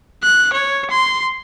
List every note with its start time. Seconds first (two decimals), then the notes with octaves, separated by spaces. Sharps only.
0.23 F#6
0.53 C#5
0.90 C6